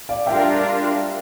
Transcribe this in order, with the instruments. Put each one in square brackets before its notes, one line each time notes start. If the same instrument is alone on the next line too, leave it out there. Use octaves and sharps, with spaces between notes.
[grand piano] D5 F5
[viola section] G3 D4 F4 A#4 [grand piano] E5 G5